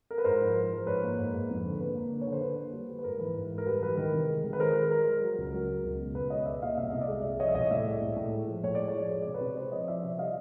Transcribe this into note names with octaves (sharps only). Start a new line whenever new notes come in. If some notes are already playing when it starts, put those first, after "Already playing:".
A#4
B4
G#2 A#4 C5
F3
F3
F3
G#2 B4 C#5
A#3
G#2
G#2
F2
D3
A#3 B4
A#3
D3
C#5
D3
C5
D3 B4
A#3
G3
G3
B4
G#2 A#4
E3 B4
G#2
G#2
A#4
G3 B4
E3 B4
D#3 A#4
C3
G#3
D#3
B4
G#3 A#4 C5
G#3
G#3 A#4
G#3
F#3
C#2
F#3 A#4
F#3
C#2
B2
C#2 B4
B2 C#5 D#5
G#3 D5 E5
A#2 D#5 F5
C2 E5
C2 D#5
D5 E5
G#3
C2
F3 C#5 D#5
E5
C2 C#5 D#5
A2 D5 E5
G#3
A2
A2
G#3
F3
A2 C#5
G#3 D5
C#5
F3 D5
G#3 C#5
C3 D5
B4 C#5
C3
G#3 C5 D5
F3 C#5 D#5
F3 D5 E5
C3
G3 D#5 F5